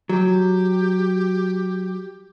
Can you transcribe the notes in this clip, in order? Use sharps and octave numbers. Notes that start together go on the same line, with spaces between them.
F#3 G4